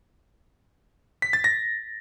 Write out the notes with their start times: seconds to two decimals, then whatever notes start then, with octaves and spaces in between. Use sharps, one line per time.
1.22 B6
1.33 A6
1.44 A#6